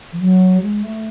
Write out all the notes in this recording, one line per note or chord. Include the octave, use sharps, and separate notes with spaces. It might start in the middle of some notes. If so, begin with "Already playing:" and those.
E3
F#3
G#3
A3